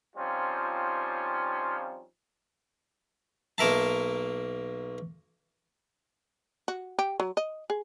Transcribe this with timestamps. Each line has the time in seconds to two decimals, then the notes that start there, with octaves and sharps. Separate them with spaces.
0.16 F3 G3 C4 C#4 D#4 F4
3.58 B1 A#3 A#4 E5 A5
6.68 F#4
6.99 G4
7.20 F#3
7.37 D#5
7.70 G#4